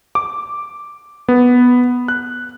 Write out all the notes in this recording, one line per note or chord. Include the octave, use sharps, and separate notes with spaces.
D6
B3
F#6